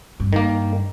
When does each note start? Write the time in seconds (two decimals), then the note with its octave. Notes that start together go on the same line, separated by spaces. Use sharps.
0.20 G2
0.33 D#3 A#3